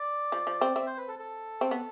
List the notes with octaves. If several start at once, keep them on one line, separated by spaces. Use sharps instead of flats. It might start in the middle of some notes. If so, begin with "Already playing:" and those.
Already playing: D5
F3
F3
C4
C4 E5
C5
B4
A4
A4
C4
B3